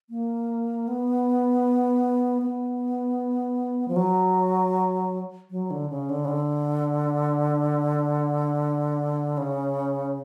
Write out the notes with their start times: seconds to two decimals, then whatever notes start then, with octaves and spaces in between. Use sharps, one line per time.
0.10 A#3
0.88 B3
2.42 B3
3.88 F3
3.96 F#3
5.51 F#3
5.71 D3
5.90 C#3
6.09 D3
6.25 C#3
6.28 D3
9.37 C#3